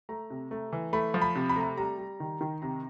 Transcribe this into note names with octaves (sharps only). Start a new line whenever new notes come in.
A3 A#5
C3
A3
E3
A3 B5
F3
B5
C3
B5
A3 A#5
B5
G3 A#5
G3
D#3
D#3
C3 A#5